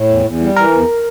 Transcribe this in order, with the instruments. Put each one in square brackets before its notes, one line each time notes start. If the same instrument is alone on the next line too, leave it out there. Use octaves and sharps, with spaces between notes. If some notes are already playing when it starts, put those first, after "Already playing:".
Already playing: [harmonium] A2
E2
E2
G3
[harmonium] E3 [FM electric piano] A#4
[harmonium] E2